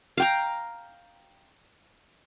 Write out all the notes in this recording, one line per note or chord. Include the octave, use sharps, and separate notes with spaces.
F5 G5 A#5